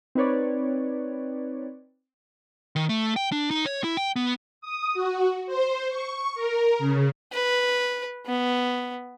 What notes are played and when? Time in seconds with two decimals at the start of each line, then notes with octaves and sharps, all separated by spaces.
0.15 C4 D#4 B4 C#5 D5
2.76 D#3
2.89 A3
3.16 G5
3.32 D4
3.51 D#4
3.66 C#5
3.84 E4
3.97 G5
4.16 B3
4.61 D#6
4.94 F#4
5.46 C5
5.89 C#6
6.35 A#4
6.79 C#3
7.33 B4
8.26 B3